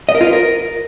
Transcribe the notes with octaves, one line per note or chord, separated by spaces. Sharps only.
D#5
A#4
F4
B4
A#4